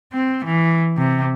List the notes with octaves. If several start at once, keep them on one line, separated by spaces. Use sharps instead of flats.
C4
E3
C3